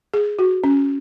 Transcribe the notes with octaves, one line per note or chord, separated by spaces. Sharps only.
G#4
F#4
C#4